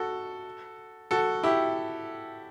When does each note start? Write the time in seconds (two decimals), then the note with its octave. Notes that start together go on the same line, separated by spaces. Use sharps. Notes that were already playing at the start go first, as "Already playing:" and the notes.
Already playing: F#4 A4
1.11 F#4 A4
1.43 E4 G4